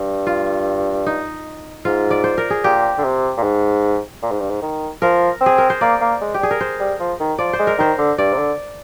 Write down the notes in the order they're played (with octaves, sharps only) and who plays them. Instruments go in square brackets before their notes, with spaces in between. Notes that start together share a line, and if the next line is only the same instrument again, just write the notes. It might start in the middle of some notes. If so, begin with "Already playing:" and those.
Already playing: [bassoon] G2
[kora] F4
D#4
[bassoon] G#2 [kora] F4
[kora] D5
C5
A#4
G#4
[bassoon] A#2 [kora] G4
[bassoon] D3
C3
A#2
G#2
A#2
G#2
G2
G#2
D#3
[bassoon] F3 [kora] A#4
[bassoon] C4
[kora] G#4
A#4
C5
[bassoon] A#3 [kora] D5
[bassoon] A#3
G#3
[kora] G4
[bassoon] G3 [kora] G#4
[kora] A#4
C5
[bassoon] G3
F3
D#3
[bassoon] F3 [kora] D5
[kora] C5
[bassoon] G#3
[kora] A#4
[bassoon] D#3 [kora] C5
[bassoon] D3
[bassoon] G2 [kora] D5
[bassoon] C3
D3